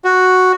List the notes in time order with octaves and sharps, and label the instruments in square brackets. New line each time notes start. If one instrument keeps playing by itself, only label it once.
[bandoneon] F#4